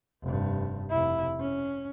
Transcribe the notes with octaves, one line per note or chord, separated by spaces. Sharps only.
F1 G2
F1 E4
C#4